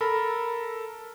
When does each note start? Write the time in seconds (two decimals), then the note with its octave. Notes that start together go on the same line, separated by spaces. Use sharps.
0.01 A4 A#4 A#5 B5